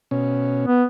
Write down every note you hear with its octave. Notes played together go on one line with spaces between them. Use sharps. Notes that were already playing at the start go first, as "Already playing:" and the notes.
B2 C#4
B3